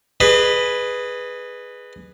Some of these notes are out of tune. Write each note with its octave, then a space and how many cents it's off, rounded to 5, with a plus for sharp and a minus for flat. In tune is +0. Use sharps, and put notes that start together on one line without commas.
G#4 +0 B4 +0 D#5 -45